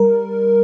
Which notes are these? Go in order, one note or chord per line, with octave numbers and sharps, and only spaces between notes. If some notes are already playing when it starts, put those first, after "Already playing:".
Already playing: G3 A#4